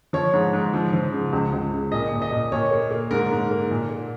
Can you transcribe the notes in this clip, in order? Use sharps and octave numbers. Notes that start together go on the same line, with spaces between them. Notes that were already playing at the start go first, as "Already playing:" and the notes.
F3 C#5
G#2
G#2
F3
F3
C#3
C#2
C#2
C#3
A#2 D#5
A#2
D#5
A#2
A#2 C#5
A#3
A#3
G#2 A#4
G#2
A#3
A#2
A#3